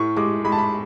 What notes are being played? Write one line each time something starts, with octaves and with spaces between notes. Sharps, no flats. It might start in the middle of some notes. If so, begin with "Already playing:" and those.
Already playing: A2 C#6
G#3 D6
G#3 B5
A5
B5